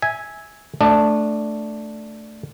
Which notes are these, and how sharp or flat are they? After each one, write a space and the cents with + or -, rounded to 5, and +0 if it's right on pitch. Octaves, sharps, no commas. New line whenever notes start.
E5 -15 G#5 +0
A3 +0 D4 +0 D5 +45